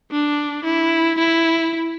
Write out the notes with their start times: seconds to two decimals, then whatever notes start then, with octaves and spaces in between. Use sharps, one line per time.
0.11 D4
0.64 E4
1.18 E4